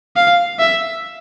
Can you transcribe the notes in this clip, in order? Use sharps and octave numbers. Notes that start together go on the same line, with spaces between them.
F5
E5